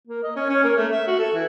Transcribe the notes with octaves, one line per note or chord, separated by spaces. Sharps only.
A#3
D#5
C#4
C#4
A#3
A3
E5
F#4
A4
E3